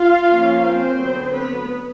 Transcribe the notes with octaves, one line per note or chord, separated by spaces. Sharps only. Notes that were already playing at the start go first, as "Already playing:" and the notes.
Already playing: F4 F5
F3 A#3 C#4
C4 C5
D3 F#3 B3
B3 B4